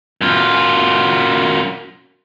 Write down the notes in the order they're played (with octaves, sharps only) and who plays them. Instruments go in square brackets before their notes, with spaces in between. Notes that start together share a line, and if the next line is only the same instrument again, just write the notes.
[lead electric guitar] F#2 F4